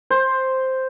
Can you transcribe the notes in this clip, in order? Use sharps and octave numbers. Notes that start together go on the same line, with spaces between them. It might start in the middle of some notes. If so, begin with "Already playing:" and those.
C5